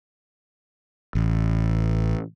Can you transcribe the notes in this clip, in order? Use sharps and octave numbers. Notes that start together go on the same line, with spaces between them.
A1